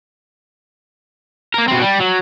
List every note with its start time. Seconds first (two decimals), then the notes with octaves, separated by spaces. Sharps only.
1.54 A#3 A#4
1.68 B2 C4
1.81 G3
1.99 F#3